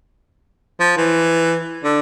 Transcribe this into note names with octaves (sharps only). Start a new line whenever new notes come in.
F3
E3
D3